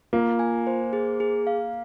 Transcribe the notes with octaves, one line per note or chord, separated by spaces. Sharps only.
A#3 F4
G#5
C5
G#4
G#4
F5